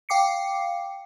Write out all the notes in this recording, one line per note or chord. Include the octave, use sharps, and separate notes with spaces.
F5 G5 D6 C7 C#7